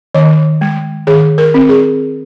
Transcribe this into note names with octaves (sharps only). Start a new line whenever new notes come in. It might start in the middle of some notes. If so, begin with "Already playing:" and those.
D#3 D#5
G#3
D#3 G#4
A#4
C4
G#4